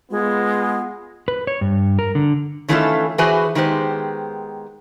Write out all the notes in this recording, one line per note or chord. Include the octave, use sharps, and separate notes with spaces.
G#3 B3 F4
B4
C#5
G2
A#4
D3
D#3 E3 A3 C#4 F4 A4
E3 F#4 G#4 B4 C5
D#3 G#3 B3 G4 C5